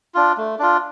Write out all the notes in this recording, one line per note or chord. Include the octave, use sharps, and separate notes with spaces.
D4 F4
A3
D4 F4